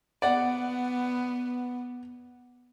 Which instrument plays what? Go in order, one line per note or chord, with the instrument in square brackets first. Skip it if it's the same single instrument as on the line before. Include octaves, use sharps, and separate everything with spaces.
[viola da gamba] B3 [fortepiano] D5 F#5